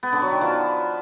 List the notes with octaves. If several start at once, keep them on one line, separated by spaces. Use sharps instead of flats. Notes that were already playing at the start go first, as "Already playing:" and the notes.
B3
D3
F#3
D#3
F3